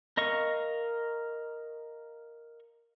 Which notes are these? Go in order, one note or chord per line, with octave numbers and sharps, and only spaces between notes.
A#4 D#5 F5 C#6